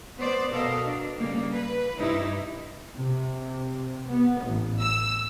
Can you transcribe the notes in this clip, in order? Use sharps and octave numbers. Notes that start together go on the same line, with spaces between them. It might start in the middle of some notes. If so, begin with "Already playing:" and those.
B3 C5 D5
B2 A4 A#4 D#5 F5
D4
C#3 G3 A#3
B4
G2 C3 D#4 E4
C3
B3
A1
E6